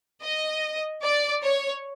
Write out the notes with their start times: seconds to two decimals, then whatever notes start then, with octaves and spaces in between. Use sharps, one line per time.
0.23 D#5
1.03 D5
1.42 C#5